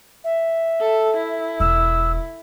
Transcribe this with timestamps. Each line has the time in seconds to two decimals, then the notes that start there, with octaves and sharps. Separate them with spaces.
0.24 E5
0.81 A4
1.17 E4
1.60 E1 E6